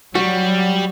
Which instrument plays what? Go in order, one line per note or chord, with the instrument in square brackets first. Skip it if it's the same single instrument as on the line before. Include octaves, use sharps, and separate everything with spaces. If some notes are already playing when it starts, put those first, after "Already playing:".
[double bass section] F#3 [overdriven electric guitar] G3 [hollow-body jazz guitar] F#4